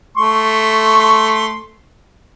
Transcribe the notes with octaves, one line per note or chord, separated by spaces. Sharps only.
A3 C6 C#6